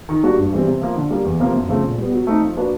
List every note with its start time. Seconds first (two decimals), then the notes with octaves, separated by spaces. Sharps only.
0.09 D#3
0.23 G3 A#3 D4 F#4
0.37 G2
0.52 E3 G3 C4
0.67 C3
0.81 F3 A#3
0.96 D3
1.10 G3 A#3
1.25 E2
1.40 C3 F3 A#3
1.54 F#2
1.69 C#3 F3 A3 C4
1.83 A#2
1.98 G3 B3
2.12 F#3
2.27 A3 C4 D#4
2.42 F3
2.56 A#3 D4 F#4 B4